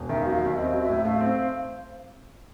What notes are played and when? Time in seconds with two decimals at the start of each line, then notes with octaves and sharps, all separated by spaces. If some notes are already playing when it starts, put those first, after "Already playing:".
Already playing: E1
0.09 D#3 E5
0.21 F5
0.26 F#3
0.33 F5
0.41 D#2 E5
0.57 C4 D#5
0.74 F#3
0.81 E5
0.89 A2
1.05 A3 F5
1.21 C4